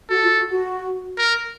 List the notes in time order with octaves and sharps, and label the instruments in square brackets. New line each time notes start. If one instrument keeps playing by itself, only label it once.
[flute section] F#4 [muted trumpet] A4
[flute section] F4
F#4
F#4
[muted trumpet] A#4